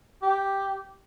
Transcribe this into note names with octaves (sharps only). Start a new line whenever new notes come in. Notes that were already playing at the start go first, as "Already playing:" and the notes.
G4